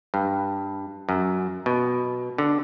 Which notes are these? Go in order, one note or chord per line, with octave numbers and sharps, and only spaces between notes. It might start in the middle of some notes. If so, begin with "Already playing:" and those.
G2
F#2
B2
D3